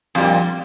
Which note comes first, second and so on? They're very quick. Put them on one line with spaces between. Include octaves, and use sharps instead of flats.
F2 G3 A#2